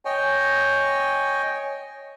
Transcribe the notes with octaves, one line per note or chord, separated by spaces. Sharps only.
C#5 D#5 G5 G#5